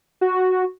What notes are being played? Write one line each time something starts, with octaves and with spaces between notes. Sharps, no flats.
F#4